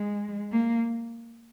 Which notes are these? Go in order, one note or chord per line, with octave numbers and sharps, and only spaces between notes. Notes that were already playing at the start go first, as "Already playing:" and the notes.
Already playing: G#3
A#3